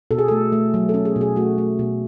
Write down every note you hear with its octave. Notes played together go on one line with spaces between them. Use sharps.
B2 A4
G#4
A3 A4
A3
F#3
C#4 A4
G#4
B2
G#4
A3 F#4
A3
B2